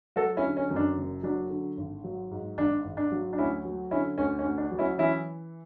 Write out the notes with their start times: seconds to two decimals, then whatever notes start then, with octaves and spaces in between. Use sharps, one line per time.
0.16 F#3 F#4 A4
0.37 C#4 E4
0.44 D3
0.57 C#4
0.69 F#2 C#4
0.76 D4
0.97 F#1
1.23 F#3 D4
1.50 D3
1.78 G#1
2.04 F#3
2.31 G#2
2.58 G#1 D4
2.85 G#1
2.97 D4
3.12 F#3
3.33 D4
3.38 D2 C#4 E4
3.65 F#3
3.91 D3 C#4 E4
4.18 D2 C#4
4.39 C#4
4.45 D2
4.58 D4
4.71 F#3
4.79 C#4 E4
4.98 E3 C#4 E4